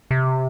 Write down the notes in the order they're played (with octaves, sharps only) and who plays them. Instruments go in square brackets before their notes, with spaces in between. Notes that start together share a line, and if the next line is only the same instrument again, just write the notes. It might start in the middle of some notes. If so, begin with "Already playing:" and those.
[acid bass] C3